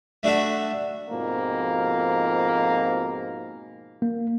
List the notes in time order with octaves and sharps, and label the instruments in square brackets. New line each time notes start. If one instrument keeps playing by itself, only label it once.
[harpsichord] A3 D4 F#4 A4 E5
[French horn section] F2 G#2 B2 F3 A#3
[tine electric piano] A#3